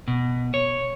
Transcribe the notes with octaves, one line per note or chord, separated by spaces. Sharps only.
B2
C#5